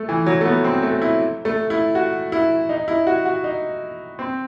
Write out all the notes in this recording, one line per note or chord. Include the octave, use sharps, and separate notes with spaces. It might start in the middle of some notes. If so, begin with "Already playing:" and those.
Already playing: A3
E3
F#3
A3
B3
C4
A3
E4
A3
E4
F#4
E4
D#4
E4
F#4
F#4
D#4
C4